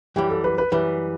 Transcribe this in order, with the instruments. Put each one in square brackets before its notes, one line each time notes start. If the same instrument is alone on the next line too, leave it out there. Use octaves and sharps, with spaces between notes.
[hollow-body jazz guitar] F#2 E3 G3 [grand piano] G4
[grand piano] A4
B4
B4
[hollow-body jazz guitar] F#2 E3 G3 [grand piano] B4